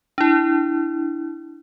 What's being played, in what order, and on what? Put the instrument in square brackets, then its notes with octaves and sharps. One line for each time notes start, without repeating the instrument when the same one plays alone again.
[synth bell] D4 E4